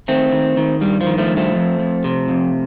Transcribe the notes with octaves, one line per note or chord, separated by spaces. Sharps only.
D#3 A3 C4
D#3
D#3
G2 G3
F3
D#3
F3 A3
G2
F3 A3
F2
F2
C3
F2